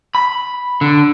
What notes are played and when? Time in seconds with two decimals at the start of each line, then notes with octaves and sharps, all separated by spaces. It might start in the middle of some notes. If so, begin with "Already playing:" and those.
0.15 B5
0.81 D3